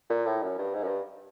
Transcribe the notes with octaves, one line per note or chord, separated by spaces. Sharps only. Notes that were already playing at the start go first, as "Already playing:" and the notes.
A#2
A2
F#2
G2
G#2
F#2
G2